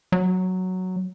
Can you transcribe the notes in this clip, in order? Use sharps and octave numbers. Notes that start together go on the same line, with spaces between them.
F#3